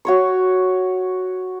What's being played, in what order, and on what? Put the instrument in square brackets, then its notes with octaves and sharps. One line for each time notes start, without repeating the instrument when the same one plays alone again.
[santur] F#4 C#5 C#6